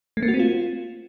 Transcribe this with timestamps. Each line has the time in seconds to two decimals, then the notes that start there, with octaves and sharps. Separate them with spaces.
0.17 A3
0.23 A#3
0.28 F#4
0.34 C4
0.39 F4